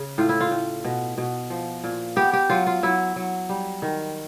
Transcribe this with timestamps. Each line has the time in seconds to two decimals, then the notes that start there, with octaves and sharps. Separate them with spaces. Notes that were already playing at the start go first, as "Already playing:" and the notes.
Already playing: C#3
0.18 A2 F4
0.29 E4
0.41 F4
0.51 A2
0.84 B2
1.18 B2
1.50 F3
1.84 A#2
2.16 B3 G4
2.33 G4
2.50 F#3 F4
2.67 F4
2.83 F#3 E4
3.16 F#3
3.49 G3
3.82 D#3